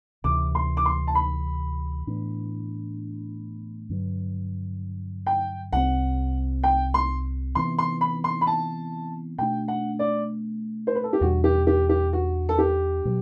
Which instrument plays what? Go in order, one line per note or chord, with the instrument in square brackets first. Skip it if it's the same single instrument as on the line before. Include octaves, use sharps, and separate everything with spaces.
[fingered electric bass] D2 C3 E3 [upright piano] D6
[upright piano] C6
D6
C6
A5
B5
[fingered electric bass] A2 E3 B3 D4
G2 D3 F#3
[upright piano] G5
[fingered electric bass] C2 C3 G3 C4 [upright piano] F#5
[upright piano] G5
C6
[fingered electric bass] C3 E3 B3 [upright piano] C6
[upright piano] C6
B5
C6
B5
A5
[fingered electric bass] B2 A3 D4 [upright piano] G5
[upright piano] F#5
D5
C5
B4
A4
G4
[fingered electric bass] E2 B2 G3 D4 [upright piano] F#4
[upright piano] G4
G4
G4
F#4
A4
G4
[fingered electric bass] B2 F#3